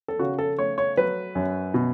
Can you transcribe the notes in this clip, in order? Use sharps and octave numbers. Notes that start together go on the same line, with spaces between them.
A4
C#3 F#4
A4
A3 C#5
C#5
F#3 B4
F#2
B2